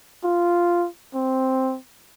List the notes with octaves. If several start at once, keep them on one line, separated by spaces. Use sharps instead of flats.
F4
C4